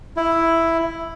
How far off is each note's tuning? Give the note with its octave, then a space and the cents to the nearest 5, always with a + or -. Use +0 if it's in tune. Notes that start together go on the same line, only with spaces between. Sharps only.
E4 +5